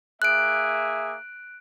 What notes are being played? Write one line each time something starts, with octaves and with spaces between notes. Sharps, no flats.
A#3 G#4 E5 F#6 D7